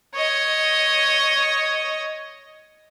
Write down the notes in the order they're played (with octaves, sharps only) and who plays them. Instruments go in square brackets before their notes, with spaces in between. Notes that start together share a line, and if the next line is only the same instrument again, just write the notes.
[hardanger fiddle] C#5 D#5